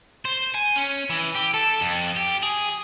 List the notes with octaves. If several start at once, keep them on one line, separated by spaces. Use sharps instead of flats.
C5
G#5
C#4
E3
G4
A4
F2
G4
G#4